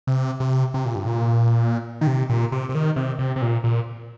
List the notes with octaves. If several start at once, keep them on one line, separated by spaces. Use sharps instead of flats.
C3
C3
C3
A#2
G2
A#2
D#3
C3
A#2
C3
C3
D#3
C3
C3
C3
A#2
A#2